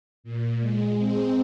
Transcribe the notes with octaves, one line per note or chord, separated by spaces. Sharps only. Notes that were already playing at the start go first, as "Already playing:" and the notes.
A#2
G#3
C4